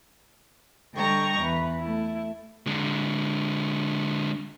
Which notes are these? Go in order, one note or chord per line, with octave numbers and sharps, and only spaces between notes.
D3 G3 D#5 G5 A#5 C#6
E2 E3 B4
A3 E4
D3 G#3